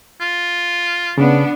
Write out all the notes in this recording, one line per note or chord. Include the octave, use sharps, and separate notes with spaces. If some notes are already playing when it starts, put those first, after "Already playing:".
F4
C#3 B3 D4